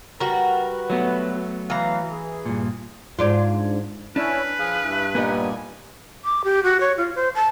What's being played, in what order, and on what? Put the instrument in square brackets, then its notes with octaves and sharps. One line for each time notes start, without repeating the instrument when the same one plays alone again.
[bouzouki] G3 F#4 [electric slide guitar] A#4 [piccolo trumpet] B4
[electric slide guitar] F#3 A3 B3
[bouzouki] E3 A#5 [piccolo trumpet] F5
[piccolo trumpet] G#4
[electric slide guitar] G2 A#2
[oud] G#2 D4 F4
[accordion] C#4 E4 [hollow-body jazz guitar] D4 [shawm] B4
[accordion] F3 [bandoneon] G#4 F5
[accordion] G2 [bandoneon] E4
[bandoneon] A#2 G3 G#5 [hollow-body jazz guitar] A#3 B3 D#4
[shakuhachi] D6
G4
F#4
C#5
F4
C5
A5